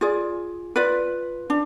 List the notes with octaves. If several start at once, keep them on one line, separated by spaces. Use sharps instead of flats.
F4 G#4 D5
F4 B4 D5
D4